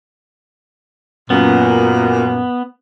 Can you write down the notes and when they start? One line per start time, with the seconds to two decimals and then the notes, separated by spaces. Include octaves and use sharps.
1.30 F#2 A#2 B3